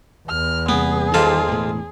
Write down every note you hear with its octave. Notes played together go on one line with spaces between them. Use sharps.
E2 F6
C3 G3 A#3 B3 G#4
G#2 D#3 E3 G3 F4 A4
E1 A2